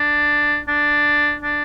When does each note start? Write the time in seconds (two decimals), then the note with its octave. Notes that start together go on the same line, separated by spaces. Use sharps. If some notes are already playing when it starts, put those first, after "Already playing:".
Already playing: D4
0.68 D4
1.43 D4